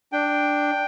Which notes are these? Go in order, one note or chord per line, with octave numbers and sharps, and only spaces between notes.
D4 G5